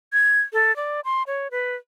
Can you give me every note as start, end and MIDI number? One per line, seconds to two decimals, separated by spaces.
0.13 0.41 92
0.53 0.75 69
0.76 1.00 74
1.05 1.23 84
1.27 1.48 73
1.51 1.76 71